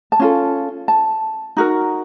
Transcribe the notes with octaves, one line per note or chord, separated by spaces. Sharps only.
A5
C#4 F4 A4
A5
D#4 F#4 A#4